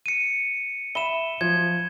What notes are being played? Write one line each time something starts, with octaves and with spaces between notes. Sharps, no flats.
C#7 D#7
E5 B5 E7 G7
F3 G#6